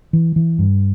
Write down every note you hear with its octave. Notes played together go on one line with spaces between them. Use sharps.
E3
E3
G2